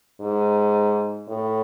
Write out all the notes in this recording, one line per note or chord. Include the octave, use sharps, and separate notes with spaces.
G#2
A2